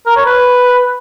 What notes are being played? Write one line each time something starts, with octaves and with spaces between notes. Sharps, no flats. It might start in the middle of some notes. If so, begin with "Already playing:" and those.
A#4
C#5
B4